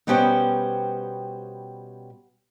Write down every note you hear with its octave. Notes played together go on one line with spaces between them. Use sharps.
B2 G3 B3 C#4 C5 G5